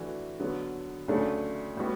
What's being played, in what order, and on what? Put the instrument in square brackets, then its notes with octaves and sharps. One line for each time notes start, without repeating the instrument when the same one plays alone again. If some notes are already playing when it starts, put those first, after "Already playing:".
Already playing: [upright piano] E3 A3 D4 F#4
D3 F#3 B3
D2 C#3 F#3 A3 D4
A2 G3 B3 F#4